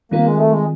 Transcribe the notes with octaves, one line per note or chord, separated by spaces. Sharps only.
D#3 G3 A#3 C4 F4 A#4
G#3
A3
G#3